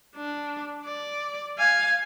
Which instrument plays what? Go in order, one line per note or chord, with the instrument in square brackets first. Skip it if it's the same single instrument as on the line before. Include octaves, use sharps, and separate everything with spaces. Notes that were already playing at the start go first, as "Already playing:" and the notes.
[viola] D4
D5
F5 G#5